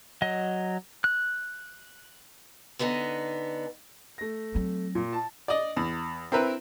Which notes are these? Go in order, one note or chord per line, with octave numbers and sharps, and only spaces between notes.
F#3 D#5
F#6
D3 B3 D#4 D#5 G#5
A3 A#6
F#3 C4
A#2
A5
D5 D#5
E2
C4 E4 A#4 B4